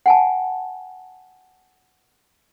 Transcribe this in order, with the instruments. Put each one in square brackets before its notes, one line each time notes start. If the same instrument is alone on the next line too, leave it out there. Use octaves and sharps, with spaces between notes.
[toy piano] F#5 G#5 A5